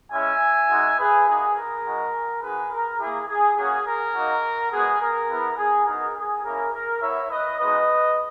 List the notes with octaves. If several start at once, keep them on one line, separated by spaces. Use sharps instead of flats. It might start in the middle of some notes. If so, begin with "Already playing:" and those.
G#3 C#4 E4 E5 G#5
G#3 D#4 F#4
G#4 B4
A#3 D#4 F#4 G#4
A#4
G#3 D#4 F#4
G#3 D#4 F#4 G#4 B4
A#4
A#3 E4 G#4
G#4
A#3 C#4 F#4 G#4
A#4
A#3 D#4 F#4
G#3 B3 F#4 G#4
A#4
B3 E4
G#4
B3 D#4 F#4 A#4
G#4
A#3 C#4 E4 A#4
A#4
B3 E4 C#5 E5
B4 D#5
G#3 B3 D#4 F#4 B4 D#5